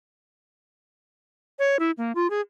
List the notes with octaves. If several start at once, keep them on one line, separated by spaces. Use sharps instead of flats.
C#5
E4
A#3
F4
G#4